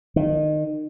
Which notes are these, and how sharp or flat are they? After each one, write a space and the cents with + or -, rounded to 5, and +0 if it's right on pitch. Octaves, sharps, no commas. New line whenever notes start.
D#3 -25